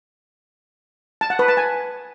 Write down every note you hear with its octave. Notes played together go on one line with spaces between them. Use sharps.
A5
F#5
B4
A5
G#5